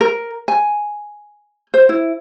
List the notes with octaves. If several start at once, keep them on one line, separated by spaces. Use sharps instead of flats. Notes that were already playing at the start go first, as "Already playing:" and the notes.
A#4
G#5
C5
E4